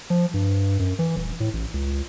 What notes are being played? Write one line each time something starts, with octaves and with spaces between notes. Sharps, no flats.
F3
G2
F#2
E3
D#1
A2
A1
C#2